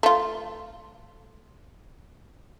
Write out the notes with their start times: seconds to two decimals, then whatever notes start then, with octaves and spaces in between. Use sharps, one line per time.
0.03 A3 F4